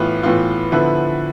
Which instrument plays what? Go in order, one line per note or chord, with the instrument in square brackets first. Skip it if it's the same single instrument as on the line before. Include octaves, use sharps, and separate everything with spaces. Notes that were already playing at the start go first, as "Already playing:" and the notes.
Already playing: [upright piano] A2 E3 B3 F4 B4
A2 E3 B3 F4
D3 F3 B3 E4 B4